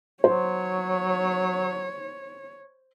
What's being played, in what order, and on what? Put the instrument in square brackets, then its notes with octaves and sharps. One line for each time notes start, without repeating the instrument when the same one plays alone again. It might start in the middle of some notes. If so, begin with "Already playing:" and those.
[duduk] F#3 [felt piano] C5 [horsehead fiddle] C#5